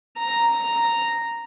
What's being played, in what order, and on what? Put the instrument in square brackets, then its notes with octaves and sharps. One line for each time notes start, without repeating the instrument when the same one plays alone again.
[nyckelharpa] A#5